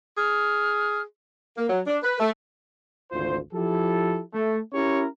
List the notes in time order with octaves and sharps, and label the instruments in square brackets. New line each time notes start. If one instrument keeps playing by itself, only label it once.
[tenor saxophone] G#4 [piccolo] F6
[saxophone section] A#3
F#3
D4
B4
A3
[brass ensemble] G#1 D2 F4 C5
F3 E4 G4 A4
A3
C#4 E4 G4 A#4 C#5